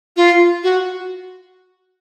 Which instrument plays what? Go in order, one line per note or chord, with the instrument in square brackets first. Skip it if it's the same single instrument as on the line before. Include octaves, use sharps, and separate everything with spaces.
[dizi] F4
F#4